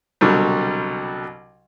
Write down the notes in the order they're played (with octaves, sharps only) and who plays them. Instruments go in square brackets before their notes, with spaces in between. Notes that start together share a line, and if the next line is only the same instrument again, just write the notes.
[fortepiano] C2 B2 D3 F#3 G3